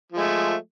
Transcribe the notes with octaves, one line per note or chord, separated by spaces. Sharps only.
F3 G#3 A3